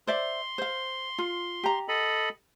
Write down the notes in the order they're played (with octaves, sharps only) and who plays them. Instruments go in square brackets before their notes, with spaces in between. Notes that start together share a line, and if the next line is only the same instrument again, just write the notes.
[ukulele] C5 D5 E5 [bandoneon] C6
[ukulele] C5 F5
F4
G4 A#5
[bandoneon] A4 D#5 B5